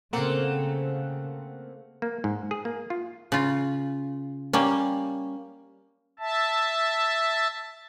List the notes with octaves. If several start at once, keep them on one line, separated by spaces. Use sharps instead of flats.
C#3 A3 A#3 C4 F#5
A#3
G#2
G#4
A#3
F4
C#3 F4
G3 A#3 C#4
E5 A5